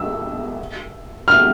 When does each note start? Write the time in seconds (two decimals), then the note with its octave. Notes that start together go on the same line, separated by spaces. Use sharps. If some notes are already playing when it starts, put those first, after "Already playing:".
Already playing: E6
1.28 F6